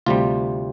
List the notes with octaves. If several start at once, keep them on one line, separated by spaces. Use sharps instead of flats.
D2 C3 G3 F4